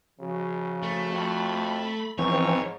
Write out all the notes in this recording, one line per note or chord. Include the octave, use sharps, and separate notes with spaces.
C#3 F3 F#4
A3
F2 B5
G#2 E3 F3 C4 C#5